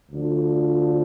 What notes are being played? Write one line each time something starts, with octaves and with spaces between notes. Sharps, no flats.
D2 D3 F3